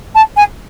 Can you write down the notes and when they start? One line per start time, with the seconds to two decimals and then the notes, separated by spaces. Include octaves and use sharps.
0.15 A5
0.36 G#5